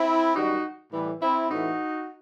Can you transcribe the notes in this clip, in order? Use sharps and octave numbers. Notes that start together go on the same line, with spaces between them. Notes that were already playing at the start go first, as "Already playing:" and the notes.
Already playing: C4 E4
F#2 D#3 G3 D#4 F#4
A2 E3 G3
C4 E4
A2 E3 A3 D#4 F#4